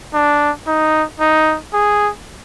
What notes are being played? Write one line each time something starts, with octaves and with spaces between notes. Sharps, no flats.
D4
D#4
D#4
G#4